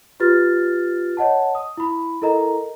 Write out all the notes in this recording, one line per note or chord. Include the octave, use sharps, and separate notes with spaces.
F4 G4 B4 F6 A6
C#5 D#5 F#5 A5
D#6
E4 B5
E4 A4 A#4 D#5 A#5